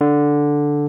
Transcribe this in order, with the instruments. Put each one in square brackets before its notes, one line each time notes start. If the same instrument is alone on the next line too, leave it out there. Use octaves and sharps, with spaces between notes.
[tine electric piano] D3